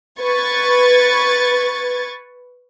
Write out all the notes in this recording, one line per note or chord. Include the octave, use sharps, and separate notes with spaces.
B4 C#6 G#6 A6